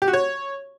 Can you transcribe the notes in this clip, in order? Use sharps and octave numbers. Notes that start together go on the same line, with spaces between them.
G4
F#4
C#5